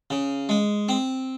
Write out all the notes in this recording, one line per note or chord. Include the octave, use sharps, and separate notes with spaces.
C#3
G#3
C4